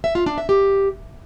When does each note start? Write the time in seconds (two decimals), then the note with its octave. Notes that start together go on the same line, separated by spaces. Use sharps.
0.04 E5
0.15 F4
0.26 D4
0.38 E5
0.49 G4